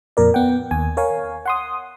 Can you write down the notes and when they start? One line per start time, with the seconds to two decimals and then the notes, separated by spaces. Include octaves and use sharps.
0.17 F2 A#2 A#4 D5
0.34 B3 F#5 G5
0.71 D#2 G#5
0.97 A#4 C#5 F5 G#5
1.46 F#5 C6 D#6